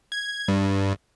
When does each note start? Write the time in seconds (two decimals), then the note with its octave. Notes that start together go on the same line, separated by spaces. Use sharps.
0.12 G#6
0.48 G2